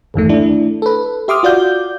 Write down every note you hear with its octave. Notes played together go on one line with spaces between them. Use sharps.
G1 E2 D#3 A3
A3 D4 E4
A4 B4
G4 E5 C6 D6 D#6 F6
F4 F#4 D5 F5 G6